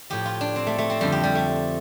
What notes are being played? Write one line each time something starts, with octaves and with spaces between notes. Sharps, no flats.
A2 F3 G4
F4
D4
C4
A3
A3
C4
F2 D3 F3 G3
G4
G3
A3